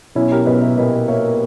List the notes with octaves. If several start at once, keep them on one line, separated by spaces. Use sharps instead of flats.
B1 C#4 E4
G4 A#4
B1 B4 D#5
C#5 E5
A#2 B4 D#5
A#3 C#5 E5